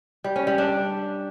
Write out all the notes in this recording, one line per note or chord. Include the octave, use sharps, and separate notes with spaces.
G3
C#4
G3
D4